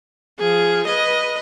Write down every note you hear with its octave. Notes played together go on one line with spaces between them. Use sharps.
F3 G#4
B4 D#5